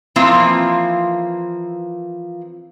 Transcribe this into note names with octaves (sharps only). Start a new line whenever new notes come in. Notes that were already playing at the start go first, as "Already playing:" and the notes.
E3 F3 A#3 C4 E4 F4